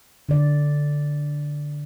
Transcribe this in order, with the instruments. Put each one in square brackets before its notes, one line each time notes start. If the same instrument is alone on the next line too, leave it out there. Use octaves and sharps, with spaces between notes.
[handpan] D3 D5